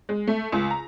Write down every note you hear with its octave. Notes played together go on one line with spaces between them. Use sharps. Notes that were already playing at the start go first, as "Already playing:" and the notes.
G#3
A3
C#2
A#5